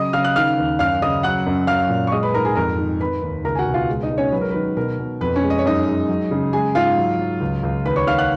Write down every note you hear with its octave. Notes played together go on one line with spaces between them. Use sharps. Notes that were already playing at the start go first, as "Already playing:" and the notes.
Already playing: C#3 F#3 D#5 D#6
C#3 F5 F6
F#6
D#3 F5 F6
D#2
F#2 F5 F6
C#3 D#5 D#6
F#3 F#5 F#6
F#2
F#3 F5 F6
A#2
C#6
G#3 D#5 D#6
B4 B5
G#2 A#4 A#5
G#4 G#5
F2 A#4 A#5
D#3
D#3 B4 B5
D#2
C#2 A#4 A#5
G#5
F#4 F#5
B2
F4 F5
G#3
D#4 D#5
G#3
C#4 C#5
F#3 B4
A#4
D#3 B4
B2 A#4
B2
F2 B4
C#4 C#5
G#3
D#5
C#5
F#2 D#4 D#5
G#3
F#3
C#3
G#3 G#4 G#5
G#2 F4 F5
F#3
F#3
C#2
C#2
D#2 B4 B5
C#5 C#6
D#3 F5 F6
F#5 F#6